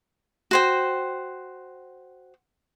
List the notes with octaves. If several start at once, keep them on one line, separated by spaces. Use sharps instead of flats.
F#4 C5 G5